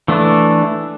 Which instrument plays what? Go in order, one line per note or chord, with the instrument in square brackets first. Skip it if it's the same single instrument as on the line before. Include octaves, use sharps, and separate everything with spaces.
[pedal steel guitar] E3 A3 D4